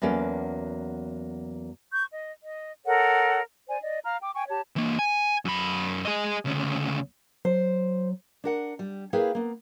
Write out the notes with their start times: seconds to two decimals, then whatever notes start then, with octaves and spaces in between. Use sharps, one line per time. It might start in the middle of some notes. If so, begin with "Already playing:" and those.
0.02 E2 F#3 A#3 C#4 A4 D5
1.92 C#6 G6
2.12 D#5
2.43 D#5
2.86 A4 A#4 C#5 F#5
3.67 C5 D5 G#5
3.82 D5 D#5
4.04 F5 A#5 F6
4.21 G5 D6
4.34 G5 G#5 C#6
4.48 G4 C#5 A5
4.76 E3 A#3
4.99 G#5
5.45 F#2 B5
6.05 G#4 D#5
6.45 D2 C#3
7.45 F#3 C5
8.44 D4 A#4 F#5
8.79 G3
9.13 A#3 E4 G#4 B4 F5 G5
9.35 A#3 B3